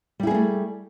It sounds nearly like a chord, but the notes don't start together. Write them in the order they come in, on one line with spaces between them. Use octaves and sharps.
G3 E4 G#4 A#3 A3